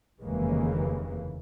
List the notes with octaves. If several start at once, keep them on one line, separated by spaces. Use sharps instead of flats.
F1 D#2 C#3 E3 G#3 A#3